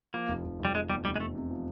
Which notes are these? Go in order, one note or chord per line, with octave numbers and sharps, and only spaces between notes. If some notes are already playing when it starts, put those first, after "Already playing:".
F3 A#3
F1
F1
F1
G3
F1 G#3
E2 G3
F1 G3
G#3
E2 A3
C3
F3